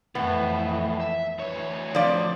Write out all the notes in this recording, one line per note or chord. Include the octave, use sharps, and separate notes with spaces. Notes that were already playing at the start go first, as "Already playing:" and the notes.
F2 A2 E3 B3
E5
D2 E3 C#5
D3 F3 C4 D5